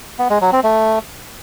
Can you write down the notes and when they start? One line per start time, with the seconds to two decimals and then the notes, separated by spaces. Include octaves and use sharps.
0.19 B3
0.30 G#3
0.41 F#3
0.52 C4
0.63 A3